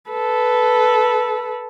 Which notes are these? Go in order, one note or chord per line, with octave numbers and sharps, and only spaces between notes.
A4 B4